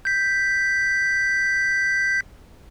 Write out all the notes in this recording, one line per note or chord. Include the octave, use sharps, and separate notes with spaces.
G6 B6